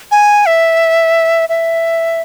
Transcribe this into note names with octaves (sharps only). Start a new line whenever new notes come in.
G#5
E5
E5